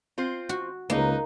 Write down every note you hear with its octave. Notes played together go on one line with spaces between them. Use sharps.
C4 F4 C5
F#4
C#2 A#3 D#4 B4 A#5